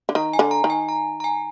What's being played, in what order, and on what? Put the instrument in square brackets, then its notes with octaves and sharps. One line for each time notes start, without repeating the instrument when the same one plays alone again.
[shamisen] D3
[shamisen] D#3 [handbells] A#5
[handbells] G#5
[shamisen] D3
[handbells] A#5
[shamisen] D#3
[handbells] G#5
A#5
A#5
G#5